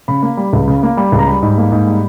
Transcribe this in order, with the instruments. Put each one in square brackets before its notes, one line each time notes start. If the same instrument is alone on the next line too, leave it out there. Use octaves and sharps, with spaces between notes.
[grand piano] C#3 B5
A#3
G3
C#2
C#3
A#3
G3
C#2
A#5
G3 B5
G#2
A#3
G#2
G3